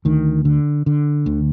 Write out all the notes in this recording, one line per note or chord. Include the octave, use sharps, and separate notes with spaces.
D2 D#3
D3
D3
D2